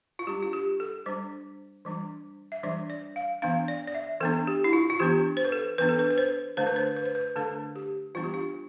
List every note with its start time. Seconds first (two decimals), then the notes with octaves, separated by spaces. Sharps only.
0.19 F4
0.27 G3 D4 G4
0.43 F4
0.53 G4
0.80 A4
1.06 G3 D4 C5
1.85 E3 G3 D4
2.52 E5
2.63 E3 G3 D4 D5
2.90 D5
3.16 F5
3.42 E3 B3 D4 F5
3.68 D5
3.87 D5
3.95 E5
4.20 E3 B3 D4 A4
4.47 G4
4.64 E4
4.73 F4
4.90 F4
5.00 E3 B3 D4 G4
5.37 C5
5.45 B4
5.52 A4
5.78 E3 B3 D4 B4
5.89 A4
5.99 B4
6.10 B4
6.18 C5
6.57 D3 A3 D4 C5
6.67 B4
6.76 C5
6.97 B4
7.06 C5
7.15 B4
7.36 D3 A3 D4 A4
7.76 G4
8.15 E3 G3 B3 D4 F4
8.24 G4
8.34 F4